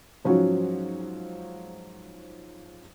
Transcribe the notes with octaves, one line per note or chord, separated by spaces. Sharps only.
G#2 F3 F#3 C#4 F#4